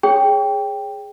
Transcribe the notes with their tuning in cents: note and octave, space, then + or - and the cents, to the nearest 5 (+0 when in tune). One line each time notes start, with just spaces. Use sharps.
G#4 +0 C#5 +10 G5 +5